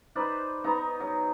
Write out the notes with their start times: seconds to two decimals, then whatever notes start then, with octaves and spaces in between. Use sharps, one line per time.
0.15 D#4 B4 C5 D5
0.64 B3 D#4 A#5
1.00 F#3